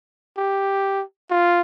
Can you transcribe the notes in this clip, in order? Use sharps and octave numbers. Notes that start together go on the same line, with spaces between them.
G4
F4